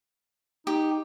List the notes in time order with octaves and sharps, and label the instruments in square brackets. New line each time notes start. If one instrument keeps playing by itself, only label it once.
[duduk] D#4 [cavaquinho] G4